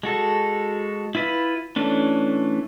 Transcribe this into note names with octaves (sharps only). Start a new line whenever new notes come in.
G#3 F#4 A4
E4 F4 B4
E3 A3 C#4 D4